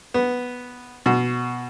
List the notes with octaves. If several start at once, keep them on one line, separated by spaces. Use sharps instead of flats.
B3
B2